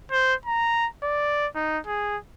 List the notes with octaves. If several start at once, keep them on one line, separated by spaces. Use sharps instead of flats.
C5
A#5
D5
D#4
G#4